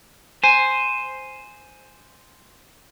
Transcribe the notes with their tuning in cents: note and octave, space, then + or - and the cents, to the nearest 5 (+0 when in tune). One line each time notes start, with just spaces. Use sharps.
C5 +0 G#5 +0